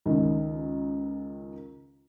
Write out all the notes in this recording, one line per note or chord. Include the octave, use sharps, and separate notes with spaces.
C#2 D#3